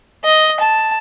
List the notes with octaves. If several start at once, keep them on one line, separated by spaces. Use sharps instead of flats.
D#5
A5